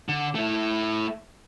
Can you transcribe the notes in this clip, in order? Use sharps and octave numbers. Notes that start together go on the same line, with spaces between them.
D3
A3 E4